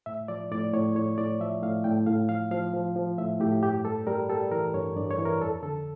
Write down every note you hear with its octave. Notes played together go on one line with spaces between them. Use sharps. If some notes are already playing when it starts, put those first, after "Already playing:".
A2 E5
F3 D5
A2 D5
A2 C#5
A2 C#5
A2 D5
F3 E5
A2 F5
A2 G5
A2 F5
F3 F5
F3 F5
F3
F3
A2 E5
A2 G4
G2 G4
G3 A4
G3 A#4
G3 A4
E3 A#4
G2 C#5
G2 D5
C#5
E3
A#4
F2 A4
D3 A4